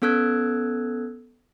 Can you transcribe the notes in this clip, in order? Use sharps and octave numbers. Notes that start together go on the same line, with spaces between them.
B3 C#4 A4 E6 F#6 G#6